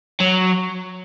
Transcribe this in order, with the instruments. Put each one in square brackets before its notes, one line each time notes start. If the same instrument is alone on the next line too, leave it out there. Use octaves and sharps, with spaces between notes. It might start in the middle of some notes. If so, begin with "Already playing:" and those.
[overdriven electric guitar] F#3